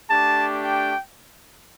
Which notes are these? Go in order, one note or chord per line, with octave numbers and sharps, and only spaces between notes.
A3 D4 G4 A5
G5